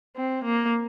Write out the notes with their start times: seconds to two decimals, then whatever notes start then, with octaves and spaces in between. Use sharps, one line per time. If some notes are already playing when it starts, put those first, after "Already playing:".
0.16 C4
0.44 A#3